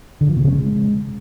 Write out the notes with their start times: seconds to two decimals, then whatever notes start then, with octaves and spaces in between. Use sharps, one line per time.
0.21 D3
0.29 F3
0.37 B2
0.45 C#3
0.53 G#3